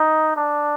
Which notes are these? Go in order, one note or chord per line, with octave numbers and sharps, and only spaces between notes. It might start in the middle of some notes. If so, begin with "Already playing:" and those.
Already playing: D#4
D4